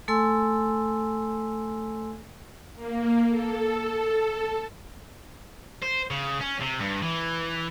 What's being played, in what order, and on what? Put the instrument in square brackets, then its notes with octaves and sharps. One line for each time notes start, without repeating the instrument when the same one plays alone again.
[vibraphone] A3 A4 G#5 C6 E6
[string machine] A#3
A4
[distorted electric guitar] C5
C#3
C#4
C3
G2
E3